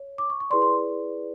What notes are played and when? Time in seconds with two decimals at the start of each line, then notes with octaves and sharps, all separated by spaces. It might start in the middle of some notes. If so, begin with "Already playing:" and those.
Already playing: C#5
0.18 D6
0.30 C#6
0.40 C#6
0.50 E4 G#4 B4 D5 C6
0.62 C6